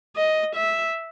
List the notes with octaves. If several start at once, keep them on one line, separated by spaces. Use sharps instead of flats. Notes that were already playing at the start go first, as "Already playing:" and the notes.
D#5
E5